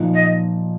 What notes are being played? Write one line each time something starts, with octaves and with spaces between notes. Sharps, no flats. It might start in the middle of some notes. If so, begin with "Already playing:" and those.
Already playing: A#2 F3 D#4
D#5